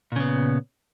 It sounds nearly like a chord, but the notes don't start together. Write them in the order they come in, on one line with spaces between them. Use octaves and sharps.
A#2 C#3 B3